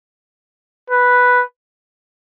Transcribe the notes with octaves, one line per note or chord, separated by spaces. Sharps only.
B4